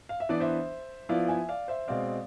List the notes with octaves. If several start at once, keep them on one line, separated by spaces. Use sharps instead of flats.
F5
E5
E3 B3 D4 D5
C5 E5
F3 B3 E4 D5 F5
E5 G#5
D5 F5
C5 E5
B2 G#3 C4 D5 F5